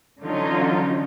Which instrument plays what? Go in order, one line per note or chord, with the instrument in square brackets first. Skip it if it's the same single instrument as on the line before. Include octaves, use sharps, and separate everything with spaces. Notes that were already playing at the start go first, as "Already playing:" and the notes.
[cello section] D3 E3 F#3 C#4 D#4 F4